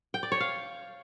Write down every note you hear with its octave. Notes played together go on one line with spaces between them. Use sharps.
G5
D5
C#5
F5